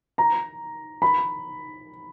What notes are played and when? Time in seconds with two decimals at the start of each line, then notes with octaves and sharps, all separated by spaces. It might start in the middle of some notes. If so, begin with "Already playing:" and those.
0.18 A#5
1.02 B5